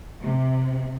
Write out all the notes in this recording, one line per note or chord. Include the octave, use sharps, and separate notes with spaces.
C3